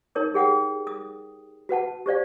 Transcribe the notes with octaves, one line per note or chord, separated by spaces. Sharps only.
D#4 A#4 C#5 D#6
G4 G#4 F#5 G5 D#6
D#6
F#4 B4 F#5 A5
G4 C5 D5 F5